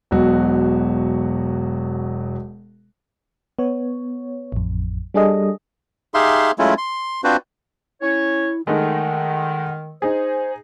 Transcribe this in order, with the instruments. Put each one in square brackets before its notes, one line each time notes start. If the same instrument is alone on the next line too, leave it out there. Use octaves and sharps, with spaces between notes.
[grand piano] E1 B2 F#3 F#4
[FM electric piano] B3 C#5
A1 F2
G3 D4 G#4 A4 D#5
[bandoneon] D#4 G4 G#4 E5 F5 C6
F#3 G#3 A3 C#4 E4 F4
C6
C4 D4 F4 F#4 B4 C5
[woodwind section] C#4 C#5 [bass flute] E4
[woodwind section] D#3 [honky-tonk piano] G#3 A3 D#4 [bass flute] F#5
[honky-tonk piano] D#4 G#4 [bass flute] C5